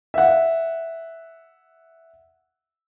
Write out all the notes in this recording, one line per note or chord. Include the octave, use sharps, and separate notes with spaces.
E5 F#5